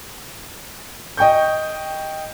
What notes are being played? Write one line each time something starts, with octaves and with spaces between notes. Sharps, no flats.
D#5 G5 C#6 G6